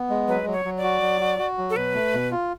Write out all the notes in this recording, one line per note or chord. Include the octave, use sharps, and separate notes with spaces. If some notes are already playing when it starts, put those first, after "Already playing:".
Already playing: B3
G#3
F#3 B4
F#3
C#5
F#3
D5
F#4
F#3
F#4
F#4
F#3
A4
B2 B4
A3
B2
F4